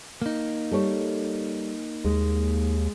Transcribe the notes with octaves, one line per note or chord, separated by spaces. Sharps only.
A#3 D#4
G3 A4 C#5
D#2 G#3